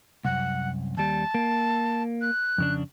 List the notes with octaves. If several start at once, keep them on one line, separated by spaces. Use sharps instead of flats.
C2 F#2 F#5
D#2 G3 A5
A#3
F#6
F2 C#3 D4